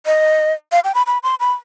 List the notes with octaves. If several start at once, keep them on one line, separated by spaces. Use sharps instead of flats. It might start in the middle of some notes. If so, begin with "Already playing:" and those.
D#5
F5
G5
B5
B5
C6
B5